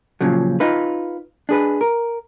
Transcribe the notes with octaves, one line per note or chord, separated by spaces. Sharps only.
A#2 C#3 F3 F#3
D#4 F4 B4
D4 G#4 B4
A#4